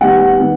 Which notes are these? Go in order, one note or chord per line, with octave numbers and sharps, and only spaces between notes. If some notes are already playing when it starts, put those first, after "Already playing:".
D#3 G3 B3 F#5
D#3 G3 B3